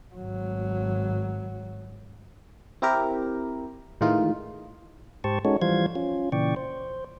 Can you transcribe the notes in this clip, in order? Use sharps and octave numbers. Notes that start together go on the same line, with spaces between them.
G#1 F#3
C4 E4 G4 A#4
A2 D#3 E3 G#3 D#4 F4
G#2 G4 C5 A5 C#6
G#3 C#4 D#4 F#4 A4 C#5
E3 F3 G3 C5 F5 G#6
C#4 F4
A#2 C#3 E3 D5 G5 C#6
C5